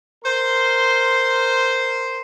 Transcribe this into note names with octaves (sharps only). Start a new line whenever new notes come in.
A#4 C5 C6